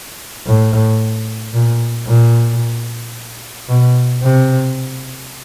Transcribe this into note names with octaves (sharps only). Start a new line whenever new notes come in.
A2
A#2
A#2
B2
C3